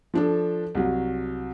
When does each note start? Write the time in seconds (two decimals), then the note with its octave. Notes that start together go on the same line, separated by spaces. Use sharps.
0.14 F3 D4 A4
0.75 C2 F#3